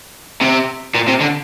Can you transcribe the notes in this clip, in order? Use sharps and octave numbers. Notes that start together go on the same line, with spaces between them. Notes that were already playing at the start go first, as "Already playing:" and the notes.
C3
A#2
C3
D3